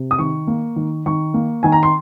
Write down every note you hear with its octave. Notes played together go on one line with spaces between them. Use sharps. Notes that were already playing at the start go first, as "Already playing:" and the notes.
Already playing: C3
D#6
D#3 C#6
A#3
D#3
D#3 C#6
A#3
D#3 G#5
A#5
C6